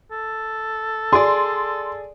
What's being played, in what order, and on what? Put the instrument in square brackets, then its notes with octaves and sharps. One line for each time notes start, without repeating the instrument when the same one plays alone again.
[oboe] A4
[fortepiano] G#4 D5 [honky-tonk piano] C6